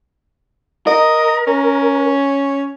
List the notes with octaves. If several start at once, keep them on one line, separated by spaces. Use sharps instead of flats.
A#4 D#5
C#4